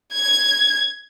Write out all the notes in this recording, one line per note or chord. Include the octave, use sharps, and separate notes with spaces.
G#6